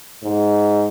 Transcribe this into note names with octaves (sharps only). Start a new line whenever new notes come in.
G#2